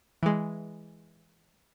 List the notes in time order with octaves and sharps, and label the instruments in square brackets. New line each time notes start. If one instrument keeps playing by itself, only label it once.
[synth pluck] E3 G#3